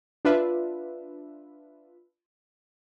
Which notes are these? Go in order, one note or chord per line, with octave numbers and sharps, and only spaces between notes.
D4 F4 B4 E5